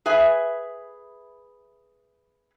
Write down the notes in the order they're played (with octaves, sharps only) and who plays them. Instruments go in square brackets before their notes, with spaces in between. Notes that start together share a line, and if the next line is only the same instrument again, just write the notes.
[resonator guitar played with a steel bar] G#4 B4 E5 G#5